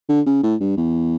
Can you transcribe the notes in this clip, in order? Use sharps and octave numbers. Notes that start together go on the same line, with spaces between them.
D3
C#3
A2
G2
E2